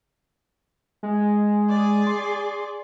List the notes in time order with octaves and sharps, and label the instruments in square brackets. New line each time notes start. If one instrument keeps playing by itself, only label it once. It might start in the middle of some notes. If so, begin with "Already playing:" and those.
[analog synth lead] G#3
[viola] G#4 D5
[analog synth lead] C6